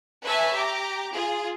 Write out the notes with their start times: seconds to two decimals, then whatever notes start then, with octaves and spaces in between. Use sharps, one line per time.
0.23 B4 C#5 E5 G#5 A5
0.53 G4 A#5 D6
1.14 F4 G#4